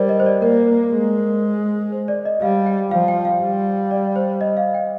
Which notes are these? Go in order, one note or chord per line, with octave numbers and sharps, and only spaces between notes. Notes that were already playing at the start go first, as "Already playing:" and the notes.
Already playing: G3 A#4 C5 D5
D#5
C5
D5
A#3 A#4
C5
G#3
C5
D5
D#5
G3 F5
G5
F3 F5
G5
F5
G3
D5
C5
D#5
F5
G5